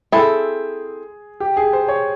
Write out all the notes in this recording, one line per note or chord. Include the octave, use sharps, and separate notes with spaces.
C4 E4 G#4 A4
G4
G#4
C5
C#5